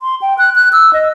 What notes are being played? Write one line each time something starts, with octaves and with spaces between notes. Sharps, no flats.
C6
G5
F#6
F#6
E6
D#5